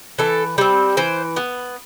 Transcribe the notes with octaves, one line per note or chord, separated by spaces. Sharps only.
E3 A4
G3 C4
E3 C5
B3